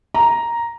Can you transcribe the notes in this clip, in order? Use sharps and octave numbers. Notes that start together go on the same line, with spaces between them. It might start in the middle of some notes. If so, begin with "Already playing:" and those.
A#5